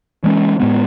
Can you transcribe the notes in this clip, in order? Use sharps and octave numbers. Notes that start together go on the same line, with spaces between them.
E3 G#3 C#4
A2 G#3 B3